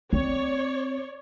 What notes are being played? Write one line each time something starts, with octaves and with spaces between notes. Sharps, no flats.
C4 C#5 D5